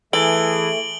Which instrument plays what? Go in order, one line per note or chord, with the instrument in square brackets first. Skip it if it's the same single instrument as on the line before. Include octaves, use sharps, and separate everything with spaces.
[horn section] E3 G#4 [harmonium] A3 [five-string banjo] A4 [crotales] D7 F#7 G7